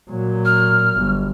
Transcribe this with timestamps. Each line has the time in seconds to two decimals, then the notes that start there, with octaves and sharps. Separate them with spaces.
0.10 A#2 F#3
0.45 F6
0.97 G1